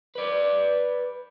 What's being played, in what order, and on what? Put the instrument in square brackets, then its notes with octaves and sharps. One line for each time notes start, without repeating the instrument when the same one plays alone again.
[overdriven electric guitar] B4 D5